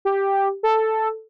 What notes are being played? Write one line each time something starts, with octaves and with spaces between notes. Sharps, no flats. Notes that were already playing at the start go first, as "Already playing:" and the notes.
G4
A4